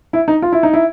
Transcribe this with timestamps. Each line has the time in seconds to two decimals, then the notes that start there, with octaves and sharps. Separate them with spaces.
0.13 E4
0.28 D#4
0.42 F4
0.52 E4
0.63 D#4
0.73 E4